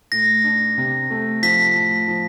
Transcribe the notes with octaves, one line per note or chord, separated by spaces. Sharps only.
A2 A#6
D4
C3
A3
F3 B6
A2
F3